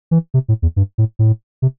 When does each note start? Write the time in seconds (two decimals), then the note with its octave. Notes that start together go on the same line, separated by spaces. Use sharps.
0.11 E3
0.34 C3
0.48 A2
0.62 E2
0.76 G2
0.98 A2
1.19 A2
1.62 C3